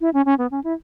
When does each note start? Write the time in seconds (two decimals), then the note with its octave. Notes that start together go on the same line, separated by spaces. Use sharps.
0.01 E4
0.14 C#4
0.25 C#4
0.38 B3
0.51 C#4
0.64 E4